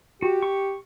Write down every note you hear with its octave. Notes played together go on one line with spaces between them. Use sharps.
F#4 G4
C#6